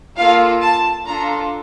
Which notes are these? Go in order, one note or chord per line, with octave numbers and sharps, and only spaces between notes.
A#3 F4 A4 F5
A5
D4 F4 A4 A#5